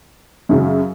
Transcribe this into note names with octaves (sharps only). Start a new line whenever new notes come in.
F#2 C#3 F#3